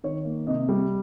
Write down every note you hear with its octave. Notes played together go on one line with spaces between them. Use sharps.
D#3 C#5
A#3
C3 D#5
G3